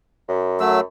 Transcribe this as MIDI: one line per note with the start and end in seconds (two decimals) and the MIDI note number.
0.28 0.82 42
0.60 0.80 54
0.60 0.80 57
0.60 0.80 88